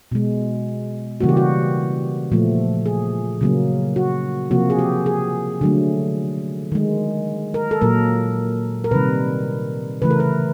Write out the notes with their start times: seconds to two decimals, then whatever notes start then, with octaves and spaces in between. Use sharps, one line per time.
0.12 B2 G#3
1.20 C#3 E3 G3 A#3 F#4
1.29 G4
1.37 F#4
2.32 A#2 F3 A3
2.86 G#4
3.41 C#3 F#3 A#3
3.96 F#4
4.51 C3 F3 A#3 F#4
4.70 G#4
4.79 G4
5.06 G#4
5.61 D3 F#3 A3
6.72 D#3 G#3
7.54 A#4
7.71 A4
7.81 A#2 F#3 A#3 A#4
8.84 A#4
8.91 C3 D#3 G3 B4
10.02 C#3 E3 A3 B4
10.10 A#4
10.20 B4